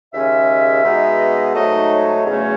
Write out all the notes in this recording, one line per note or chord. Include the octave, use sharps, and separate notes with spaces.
D#2 C#3 G#3 C#4 E5
B2 G#3 B3 D#4
G#2 F#3 A3 D#4 D#5
C#5
E2 C#3 F#3 A3 C#4